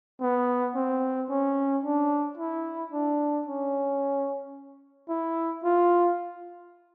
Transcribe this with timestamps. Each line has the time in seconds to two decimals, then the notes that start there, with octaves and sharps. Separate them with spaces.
0.21 B3
0.75 C4
1.30 C#4
1.84 D4
2.38 E4
2.92 D4
3.46 C#4
5.09 E4
5.64 F4